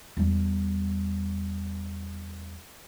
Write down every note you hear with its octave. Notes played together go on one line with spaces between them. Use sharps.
E2 G3